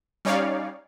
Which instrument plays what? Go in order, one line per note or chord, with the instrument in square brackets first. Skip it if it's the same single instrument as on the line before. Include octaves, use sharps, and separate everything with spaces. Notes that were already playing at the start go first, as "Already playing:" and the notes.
[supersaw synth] G3 C#4 D#4 C#5 D5 F5